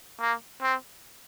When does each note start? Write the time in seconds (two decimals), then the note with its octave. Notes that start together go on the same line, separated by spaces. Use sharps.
0.20 A#3
0.62 C4